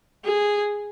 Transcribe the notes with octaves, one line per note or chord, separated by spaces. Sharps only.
G#4